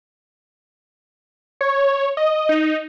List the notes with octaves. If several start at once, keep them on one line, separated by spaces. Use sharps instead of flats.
C#5
D#5
D#4